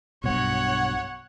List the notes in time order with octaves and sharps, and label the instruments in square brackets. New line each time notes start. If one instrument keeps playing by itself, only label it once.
[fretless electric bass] B1 G2 B2 [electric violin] C#5 F#5